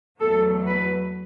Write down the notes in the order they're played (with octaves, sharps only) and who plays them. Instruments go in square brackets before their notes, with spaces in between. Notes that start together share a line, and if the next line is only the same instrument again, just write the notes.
[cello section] E2 B2 F#3 A3 A4
B4